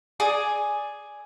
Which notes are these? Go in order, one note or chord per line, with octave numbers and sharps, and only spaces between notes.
G#4 D5 G#5 D#6